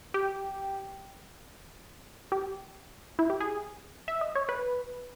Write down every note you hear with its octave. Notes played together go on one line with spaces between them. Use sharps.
G4
G4
E4
G4
G#4
E5
D#5
C#5
B4